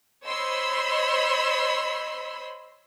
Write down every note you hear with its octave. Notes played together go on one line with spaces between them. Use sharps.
C5 C#5 D#5 B5 C6 E6